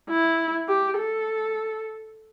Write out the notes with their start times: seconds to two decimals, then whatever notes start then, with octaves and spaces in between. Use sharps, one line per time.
0.10 E4
0.68 G4
0.98 A4